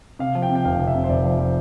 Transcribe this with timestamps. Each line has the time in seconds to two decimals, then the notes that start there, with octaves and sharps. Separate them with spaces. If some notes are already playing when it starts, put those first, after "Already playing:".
0.19 C3 F5
0.35 F3
0.42 G5
0.50 C3
0.55 G5
0.65 F1 F5
0.79 F1
0.87 E5
0.94 C3
1.04 C5
1.09 F1 D5
1.24 F3
1.39 F3